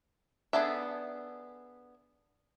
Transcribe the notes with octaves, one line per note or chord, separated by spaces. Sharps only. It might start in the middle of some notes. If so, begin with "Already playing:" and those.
B3 D4 G#4 A4 E5